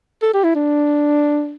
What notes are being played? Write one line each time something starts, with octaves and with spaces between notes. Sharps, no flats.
A4
G4
E4
D4